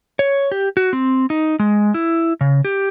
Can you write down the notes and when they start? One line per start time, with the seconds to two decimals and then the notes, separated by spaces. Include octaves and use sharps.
0.19 C#5
0.52 G4
0.77 F#4
0.93 C4
1.30 D#4
1.59 G#3
1.94 E4
2.41 C#3
2.65 G4